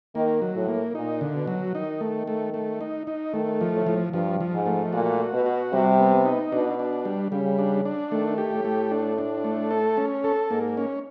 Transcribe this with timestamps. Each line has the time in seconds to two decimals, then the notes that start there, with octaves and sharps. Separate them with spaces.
0.15 D#3 A#3
0.42 F#3
0.55 A2
0.68 A#3
0.94 A#2 D#4
1.21 D3
1.34 B2
1.47 F#3
1.74 D#3 D#4
2.01 A3
2.28 A3
2.54 A3
2.81 D#4
3.07 D#4
3.34 D#3 A3
3.61 F3
3.73 A2
3.86 F3
4.13 G2 F3
4.40 F3
4.53 G#2
4.66 A3
4.93 A#2 F#4
5.20 F#4
5.33 B2
5.46 F#4
5.73 C3 G3
5.99 B3
6.25 D#4
6.52 B2 D4
6.79 D4
7.05 G3
7.32 C#3 G3
7.58 D4
7.85 D4
8.11 D#3 A3
8.38 G4
8.52 A2
8.65 A3
8.91 D4
9.18 D4
9.44 A3
9.71 A4
9.97 C#4
10.24 A4
10.50 G#2 A#3
10.77 C#4